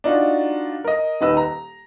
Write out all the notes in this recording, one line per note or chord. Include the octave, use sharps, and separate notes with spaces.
D4 D#4 F4 F#4
A#4 D#5
D#1 D#3 B4 D#5 E6
A#5